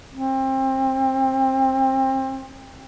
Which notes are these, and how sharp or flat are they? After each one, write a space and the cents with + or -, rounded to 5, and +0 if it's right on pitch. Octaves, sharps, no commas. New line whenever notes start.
C4 +25